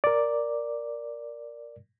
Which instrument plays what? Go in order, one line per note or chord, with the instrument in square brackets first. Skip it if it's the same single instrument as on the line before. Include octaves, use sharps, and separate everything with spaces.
[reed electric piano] A#4 D5